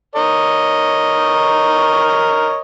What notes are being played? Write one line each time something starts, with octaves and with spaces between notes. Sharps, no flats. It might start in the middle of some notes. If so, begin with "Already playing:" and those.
A#4 C#5 D#5